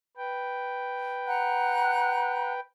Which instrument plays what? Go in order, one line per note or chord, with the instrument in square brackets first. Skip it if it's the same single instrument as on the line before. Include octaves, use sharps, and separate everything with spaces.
[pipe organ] B4 G5
[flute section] F#5 A#5 F#6